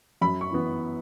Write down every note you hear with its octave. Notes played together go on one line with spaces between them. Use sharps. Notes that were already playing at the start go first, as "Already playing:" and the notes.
F#2 B5
C#6
E3 B3